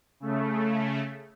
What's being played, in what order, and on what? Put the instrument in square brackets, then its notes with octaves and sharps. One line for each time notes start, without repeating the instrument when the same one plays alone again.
[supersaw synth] C#3 A3